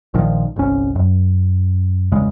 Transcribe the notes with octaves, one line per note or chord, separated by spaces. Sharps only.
A#1 A#2 D#3 F3
G1 C2 C#4
F#2
G1 E2 C#3 G#3